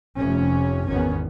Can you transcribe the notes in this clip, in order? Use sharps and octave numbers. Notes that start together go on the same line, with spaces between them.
F1 F2 C3 C#4
G#1 E2 D#3 B3 C#4